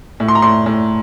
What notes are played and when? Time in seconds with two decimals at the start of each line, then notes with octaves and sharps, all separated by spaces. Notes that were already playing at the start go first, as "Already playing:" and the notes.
0.20 A2
0.28 C6
0.35 A#5
0.42 A2 C6
0.66 A2